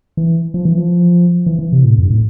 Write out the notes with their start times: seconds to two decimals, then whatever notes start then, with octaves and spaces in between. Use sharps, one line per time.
0.17 E3
0.54 F3
0.65 E3
0.77 F3
1.46 E3
1.59 E3
1.72 C3
1.84 A2
1.98 F2
2.04 G2
2.10 A2